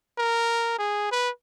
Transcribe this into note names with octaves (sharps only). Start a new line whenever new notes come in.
A#4
G#4
B4